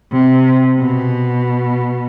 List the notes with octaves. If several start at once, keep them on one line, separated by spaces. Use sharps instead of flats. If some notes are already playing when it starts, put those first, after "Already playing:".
C3
B2